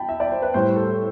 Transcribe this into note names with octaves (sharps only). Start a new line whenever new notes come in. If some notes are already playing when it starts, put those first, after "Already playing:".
Already playing: G5 A5 B5
E5
D5
C5
B4
A2 G3 C5
A4